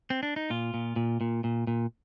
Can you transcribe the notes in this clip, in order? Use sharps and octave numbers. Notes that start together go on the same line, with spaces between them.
C4
D4
D#4
A#2 F4
A#2
A#2
A#2
A#2
A#2